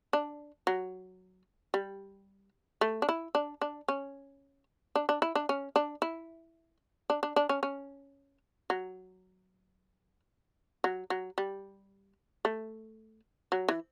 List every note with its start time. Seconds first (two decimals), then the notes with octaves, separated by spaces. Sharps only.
0.13 D4
0.67 F#3
1.74 G3
2.81 A3
3.02 D4
3.09 E4
3.35 D4
3.61 D4
3.88 C#4
4.95 D4
5.09 D4
5.22 E4
5.35 D4
5.49 C#4
5.76 D4
6.02 E4
7.10 D4
7.23 D4
7.36 D4
7.49 C#4
7.63 C#4
8.70 F#3
10.84 F#3
11.10 F#3
11.38 G3
12.45 A3
13.52 F#3
13.69 E3